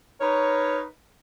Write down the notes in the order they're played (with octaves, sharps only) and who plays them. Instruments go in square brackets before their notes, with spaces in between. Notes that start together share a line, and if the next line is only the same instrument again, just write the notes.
[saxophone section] D#4 A#4 B4 C#5